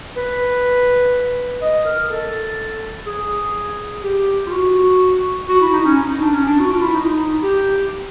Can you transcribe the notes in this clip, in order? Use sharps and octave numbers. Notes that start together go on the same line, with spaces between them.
B4
D#5
A#4
A4
G#4
G4
F4
F#4
F#4
E4
D#4
C#4
D#4
D4
C#4
D4
F#4
F4
E4
D#4
G4